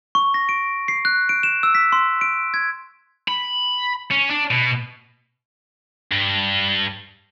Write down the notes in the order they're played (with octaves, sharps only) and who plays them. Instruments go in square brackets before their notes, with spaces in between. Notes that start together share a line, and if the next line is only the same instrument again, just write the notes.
[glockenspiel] C#6
A#6
D7
C7
F#6
D7
E7
E6
B6
C6
D7
G#6
[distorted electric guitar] B5
C#4
D4
B2
G2